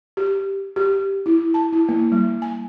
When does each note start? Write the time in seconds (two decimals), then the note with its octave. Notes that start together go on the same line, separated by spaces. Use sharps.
0.17 G4
0.76 G4
1.26 E4
1.54 A5
1.73 E4
1.89 A#3
2.12 G3
2.42 G#5